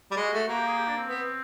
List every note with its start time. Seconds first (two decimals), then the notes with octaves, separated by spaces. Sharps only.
0.11 G3
0.17 G#3 F#4
0.33 A3
0.47 A#3 F#4
0.57 G4
0.67 G#4
0.77 G4
0.88 D4
0.97 C4
1.07 B3